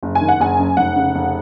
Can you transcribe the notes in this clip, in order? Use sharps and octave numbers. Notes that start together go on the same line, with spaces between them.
F#1
G#5
D#3
F#5
F#1 G#5
F#2
F1 F#5
C#3
F1